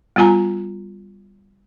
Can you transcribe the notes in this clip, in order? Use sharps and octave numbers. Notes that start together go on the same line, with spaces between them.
G3 B3 F4 G#5 A#5